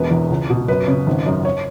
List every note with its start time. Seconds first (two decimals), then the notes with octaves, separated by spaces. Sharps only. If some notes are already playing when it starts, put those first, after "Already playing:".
Already playing: E1 B2 B4
0.11 E2
0.30 C#2
0.49 B2
0.68 F#2 B4
0.87 C#3
1.07 G#1
1.26 F#2
1.45 C#5